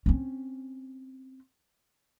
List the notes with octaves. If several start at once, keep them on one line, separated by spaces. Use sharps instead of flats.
C4 C#4